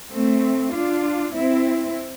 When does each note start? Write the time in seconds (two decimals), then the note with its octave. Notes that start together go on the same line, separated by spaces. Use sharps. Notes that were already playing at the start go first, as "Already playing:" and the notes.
0.12 A3 C4
0.73 D4 F4
1.35 C4 E4